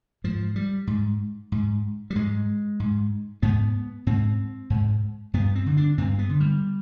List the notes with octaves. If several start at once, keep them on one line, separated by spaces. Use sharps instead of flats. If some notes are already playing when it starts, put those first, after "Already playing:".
G#2 F3
G3
G#2
G#2
G3
G#2 G#3
G#2
G#2 B3
G#2 C4
G#2
G2 B3
C4
D3
D4
G2 C4
B3
D3
G3